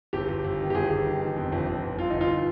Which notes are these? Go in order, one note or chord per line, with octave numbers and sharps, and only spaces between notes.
G1 G4
G1
G1
D#3
G4
G1 G#4
G1
D#3
D#3
F2
G1
G1
G1
G1 F4
G1 D#4
F4